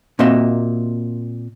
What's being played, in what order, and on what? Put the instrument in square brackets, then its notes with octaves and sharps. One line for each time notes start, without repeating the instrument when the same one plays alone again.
[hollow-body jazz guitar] A#2 A#3 C4 F#4 D#5 E5